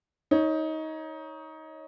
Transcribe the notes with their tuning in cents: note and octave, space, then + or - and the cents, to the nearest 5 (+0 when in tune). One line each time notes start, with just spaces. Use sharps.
D#4 +20 C#5 +0